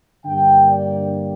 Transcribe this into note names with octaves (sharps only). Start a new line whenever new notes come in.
G2 D3 A#3 G5
D5